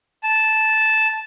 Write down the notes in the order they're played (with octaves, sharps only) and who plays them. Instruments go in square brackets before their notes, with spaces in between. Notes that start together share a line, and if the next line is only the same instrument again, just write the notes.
[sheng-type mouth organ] A5